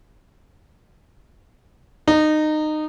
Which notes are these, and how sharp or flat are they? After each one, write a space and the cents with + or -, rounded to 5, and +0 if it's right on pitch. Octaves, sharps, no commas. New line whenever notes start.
D#4 -20